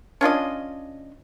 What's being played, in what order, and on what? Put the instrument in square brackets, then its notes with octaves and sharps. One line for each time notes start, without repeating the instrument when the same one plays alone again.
[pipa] C#4 D4 F4 D#5